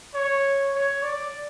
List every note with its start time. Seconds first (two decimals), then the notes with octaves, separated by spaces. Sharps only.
0.15 C#5
0.75 C#5
1.03 D5